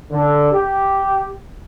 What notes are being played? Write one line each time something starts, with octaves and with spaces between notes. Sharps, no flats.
D3
G4